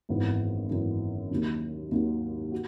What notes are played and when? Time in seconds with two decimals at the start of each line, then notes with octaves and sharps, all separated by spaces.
0.09 G#1 F#2 E3 B3
0.70 G#1 F#2 E3 B3
1.31 D#2 D#3 F#3
1.91 D#2 D#3 F#3
2.52 F#4